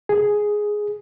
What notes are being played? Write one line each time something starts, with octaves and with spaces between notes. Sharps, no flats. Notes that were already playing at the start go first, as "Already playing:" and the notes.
G#4